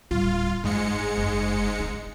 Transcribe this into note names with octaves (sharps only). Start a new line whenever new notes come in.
D1 G3 F4
F#1 G#2 G#3 C#7
F#1
D4